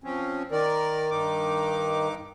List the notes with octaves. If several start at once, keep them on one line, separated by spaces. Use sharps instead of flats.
F3 C4 C#4
D#3 A#4 D5
G2 D#4 D6